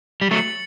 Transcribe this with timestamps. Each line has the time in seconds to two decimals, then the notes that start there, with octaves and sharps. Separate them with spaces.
0.22 G3
0.30 F#3 A3 A6 C#7 F#7